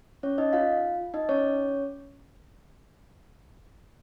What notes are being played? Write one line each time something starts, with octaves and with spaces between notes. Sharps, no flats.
C#4 C#5
D#4 D#5
F4 F5
D#4 D#5
C#4 C#5